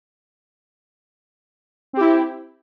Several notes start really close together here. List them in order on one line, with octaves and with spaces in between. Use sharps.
C4 G4 E4